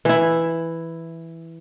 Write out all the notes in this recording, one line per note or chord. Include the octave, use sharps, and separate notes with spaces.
E3 E4